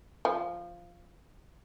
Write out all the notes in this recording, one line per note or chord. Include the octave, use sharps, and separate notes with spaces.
F3